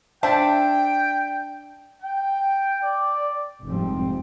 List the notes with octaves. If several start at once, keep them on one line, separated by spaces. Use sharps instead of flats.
D4 C5 E5 G5 A5
G5
D5
F1 F2 G#2 F3 G3 C4